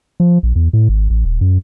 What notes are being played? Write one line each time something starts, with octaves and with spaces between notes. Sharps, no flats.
F3
A#1
E2
A2
G#1
A1
D#1
F#2